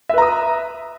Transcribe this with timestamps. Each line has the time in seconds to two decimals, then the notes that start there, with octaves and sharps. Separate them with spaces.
0.09 E5
0.14 B4
0.18 A#5
0.22 D#6